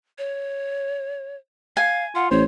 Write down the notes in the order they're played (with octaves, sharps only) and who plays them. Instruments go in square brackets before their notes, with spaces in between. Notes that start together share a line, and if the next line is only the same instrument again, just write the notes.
[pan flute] C#5
[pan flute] F5 [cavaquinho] G#5
[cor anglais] F4 [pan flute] F#5
[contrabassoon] A1 [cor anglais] C5 [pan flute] C#5